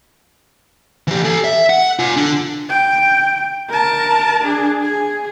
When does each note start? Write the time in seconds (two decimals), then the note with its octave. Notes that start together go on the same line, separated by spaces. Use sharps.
1.08 E3 G4
1.25 A4 G#5
1.44 E5
1.70 F#5
1.99 F4 G#5
2.17 D3
2.69 G5
3.69 A#4 A5
4.44 D4 G#4
4.81 G#4